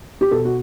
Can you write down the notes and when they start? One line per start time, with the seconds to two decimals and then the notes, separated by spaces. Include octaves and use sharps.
0.21 G4
0.31 B2 A4
0.45 F#4